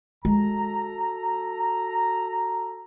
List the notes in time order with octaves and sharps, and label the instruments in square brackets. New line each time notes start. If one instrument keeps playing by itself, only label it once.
[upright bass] G#3 [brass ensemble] F#4 A4 A#5